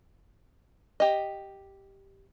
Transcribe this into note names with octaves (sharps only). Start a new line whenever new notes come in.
G4 D#5